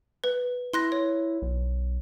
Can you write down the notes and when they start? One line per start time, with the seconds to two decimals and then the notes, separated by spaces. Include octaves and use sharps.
0.24 B4
0.74 E4 C6 F#6 A#6
0.92 C#5
1.42 B1